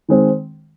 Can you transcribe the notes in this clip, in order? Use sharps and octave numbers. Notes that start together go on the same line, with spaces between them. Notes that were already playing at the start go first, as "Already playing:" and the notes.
D#3 G#3 C4